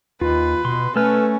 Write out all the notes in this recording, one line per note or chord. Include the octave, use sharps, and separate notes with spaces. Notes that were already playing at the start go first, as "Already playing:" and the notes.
D#2 F4 B4
B2 C6
A3 C#4 A4 B4 G#5 F6